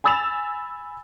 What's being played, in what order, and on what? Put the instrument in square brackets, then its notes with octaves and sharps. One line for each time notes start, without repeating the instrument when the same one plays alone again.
[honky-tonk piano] G#5 B5 E6 A6 E7 F7